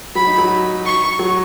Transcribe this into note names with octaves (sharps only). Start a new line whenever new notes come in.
F#3 B5
D#4
F#3
C#6
F#3